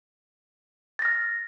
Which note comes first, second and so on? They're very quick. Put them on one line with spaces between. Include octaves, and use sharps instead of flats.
A6 A#6 F6